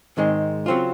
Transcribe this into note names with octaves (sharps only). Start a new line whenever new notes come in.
G#2 D#3 G#3 C4
C#3 F#3 C4 F4